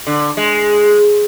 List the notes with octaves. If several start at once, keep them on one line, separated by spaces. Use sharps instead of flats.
D3
G#3